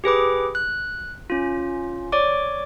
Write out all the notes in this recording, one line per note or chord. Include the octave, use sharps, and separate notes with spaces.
G4 G#4 B4 D6
F#6
C#4 F4
C#5 D5 D6